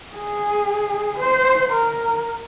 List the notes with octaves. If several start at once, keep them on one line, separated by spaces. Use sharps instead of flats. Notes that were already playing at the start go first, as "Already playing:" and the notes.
G#4
C5
A#4